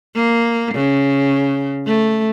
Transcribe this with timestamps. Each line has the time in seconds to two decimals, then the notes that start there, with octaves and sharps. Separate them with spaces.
0.15 A#3
0.74 C#3
1.86 A3